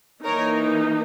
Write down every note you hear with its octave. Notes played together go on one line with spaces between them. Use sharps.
E3 A#3 D#4 A#4 C#5